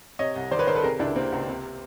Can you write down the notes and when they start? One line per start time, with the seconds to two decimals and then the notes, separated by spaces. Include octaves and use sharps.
0.19 C3 C#5 D#5
0.36 C2
0.51 D#3 C5 D5
0.59 B4 C#5
0.67 D#3 A#4 C5
0.76 A4 B4
0.83 C3 G#4 A#4
0.99 C#2 D4 E4
1.16 C3 A#3 C4
1.32 C#2
1.48 C3